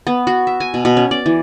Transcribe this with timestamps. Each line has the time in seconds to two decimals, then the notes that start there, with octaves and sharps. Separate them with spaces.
0.07 B3
0.27 F#4
0.47 E5
0.60 G#5
0.74 B2
0.85 B2
0.97 C#4
1.11 D5
1.26 E3